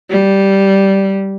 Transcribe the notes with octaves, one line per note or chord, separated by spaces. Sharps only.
G3